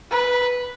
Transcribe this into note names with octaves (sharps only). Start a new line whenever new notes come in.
B4